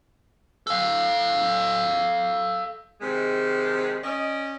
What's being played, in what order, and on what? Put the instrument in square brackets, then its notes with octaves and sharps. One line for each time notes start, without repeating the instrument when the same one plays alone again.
[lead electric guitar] A4 F5
[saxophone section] C3 D#3 G#3
C#4 D5 D#5